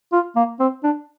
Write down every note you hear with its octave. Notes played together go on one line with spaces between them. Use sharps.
F4
A#3
C4
D4